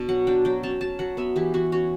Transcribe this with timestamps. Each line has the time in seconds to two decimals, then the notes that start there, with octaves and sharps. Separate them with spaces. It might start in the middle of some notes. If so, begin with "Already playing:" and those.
Already playing: B2 D4 A5
0.09 F#3 F#5
0.27 D4 G5
0.45 F#3 G5
0.63 C#4 A5
0.81 F#3 A5
0.99 F#3 F#5
1.17 B3 E5
1.36 E3 G4
1.54 E3 F#4
1.72 C#4 F#4